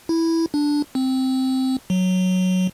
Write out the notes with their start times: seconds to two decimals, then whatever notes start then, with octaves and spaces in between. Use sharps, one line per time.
0.09 E4
0.54 D4
0.95 C4
1.90 F#3